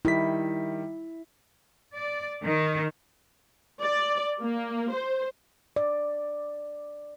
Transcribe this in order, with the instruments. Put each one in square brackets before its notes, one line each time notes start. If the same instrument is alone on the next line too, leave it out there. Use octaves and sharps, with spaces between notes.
[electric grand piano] D#3 G3 B6 [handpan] E4
[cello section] D5
D#3
[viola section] D5
A#3
C5
[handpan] D5